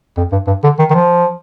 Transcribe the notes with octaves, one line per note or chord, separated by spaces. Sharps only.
F2
G2
G2
D3
D#3
D#3
F3